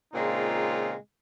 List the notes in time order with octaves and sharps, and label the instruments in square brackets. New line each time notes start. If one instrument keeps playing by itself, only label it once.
[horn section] A#2 C#3 G#3 C4 D#4 F4